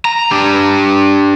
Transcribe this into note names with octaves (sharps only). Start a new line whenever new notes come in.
A#5
D4 G4